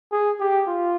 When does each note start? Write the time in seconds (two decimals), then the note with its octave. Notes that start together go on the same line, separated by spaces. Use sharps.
0.12 G#4
0.40 G4
0.68 F4